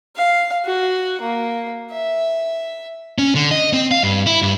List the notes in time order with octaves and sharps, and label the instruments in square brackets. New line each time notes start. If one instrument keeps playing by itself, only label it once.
[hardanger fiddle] F5
F#4
A#3
E5
[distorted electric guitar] C#4
D3
D#5
C4
F5
G2
E4
G2